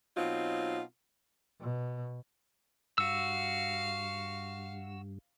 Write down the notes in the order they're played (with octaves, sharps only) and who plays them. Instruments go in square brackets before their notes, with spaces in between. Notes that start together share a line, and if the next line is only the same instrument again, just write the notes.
[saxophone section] B2 F#3 C4 D#4 F4
[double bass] B2
[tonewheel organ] G2 [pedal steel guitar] F#4 E6 [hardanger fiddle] F5